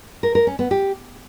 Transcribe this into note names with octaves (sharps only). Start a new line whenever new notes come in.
A#4
A#4
C#4
B3
G4